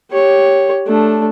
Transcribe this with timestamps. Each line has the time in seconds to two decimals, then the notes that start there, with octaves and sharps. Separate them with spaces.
0.12 G4 C#5
0.88 A3 D4